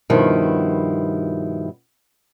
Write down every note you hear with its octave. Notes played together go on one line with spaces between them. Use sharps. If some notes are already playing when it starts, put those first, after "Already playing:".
G2 B2 D#3 F3 E4